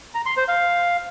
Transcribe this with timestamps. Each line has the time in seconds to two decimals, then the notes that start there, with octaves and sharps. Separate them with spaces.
0.15 A#5
0.26 C6
0.37 C5
0.48 F5